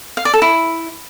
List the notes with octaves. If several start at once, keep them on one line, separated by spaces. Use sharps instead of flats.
F5
D5
A4
E4